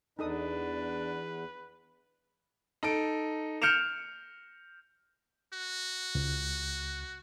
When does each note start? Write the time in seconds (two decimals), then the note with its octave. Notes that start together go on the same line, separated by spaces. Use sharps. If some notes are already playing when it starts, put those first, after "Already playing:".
0.19 E2 D4 D#4 A4 B4 D#6
2.83 D#4 A4 D7
3.62 F6 G6 C#7 D7 E7 F7
5.53 F#4
6.15 C#2